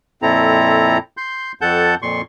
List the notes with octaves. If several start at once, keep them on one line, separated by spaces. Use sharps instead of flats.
F2 A#2 C4 E4 A4 A#5
C6 G6
F2 A4 F#5 A5 G6
F2 A#2 C6 C#6